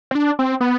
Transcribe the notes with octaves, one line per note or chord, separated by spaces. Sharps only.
C4
D4
C4
B3